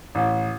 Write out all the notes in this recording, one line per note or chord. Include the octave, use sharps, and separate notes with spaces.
A1